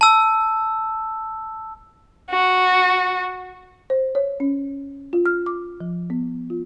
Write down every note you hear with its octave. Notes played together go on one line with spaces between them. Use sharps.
A5 E6
F#4
C5
C#5
C#4
F4
F6
D6
F3
B3
F4